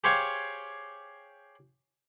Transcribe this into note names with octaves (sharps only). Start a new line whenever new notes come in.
G4 G#4 C5 C#5 F5 G5